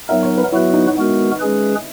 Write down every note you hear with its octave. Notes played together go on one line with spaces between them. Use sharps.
F#3 B3 D#4 A#4 E5
C#5
B4
F#3 B3 E4 F#4 B4
D#4
G#3 B3 F#4 A#4
G#3 C#4 G#4 B4